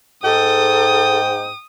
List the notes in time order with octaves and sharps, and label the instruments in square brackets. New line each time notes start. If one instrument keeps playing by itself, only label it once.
[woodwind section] G#2 [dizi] A4 [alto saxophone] G5 [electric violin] D#6